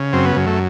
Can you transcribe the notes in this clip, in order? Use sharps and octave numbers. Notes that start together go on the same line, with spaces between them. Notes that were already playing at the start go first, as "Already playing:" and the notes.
Already playing: C#3
F#2 C4
B3
F#2
A3